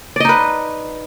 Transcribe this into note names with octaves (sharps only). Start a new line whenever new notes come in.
D#4 B4 D5 D#5